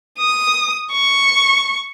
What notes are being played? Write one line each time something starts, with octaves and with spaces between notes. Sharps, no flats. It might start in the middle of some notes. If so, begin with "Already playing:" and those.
D#6
C#6